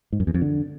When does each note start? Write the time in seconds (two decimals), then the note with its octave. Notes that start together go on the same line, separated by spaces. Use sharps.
0.13 G#2
0.20 F#2
0.27 E2
0.34 F2
0.42 D3